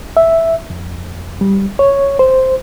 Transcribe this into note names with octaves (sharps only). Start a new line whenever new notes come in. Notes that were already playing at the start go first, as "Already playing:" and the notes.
E5
F2
G3
C#5
C5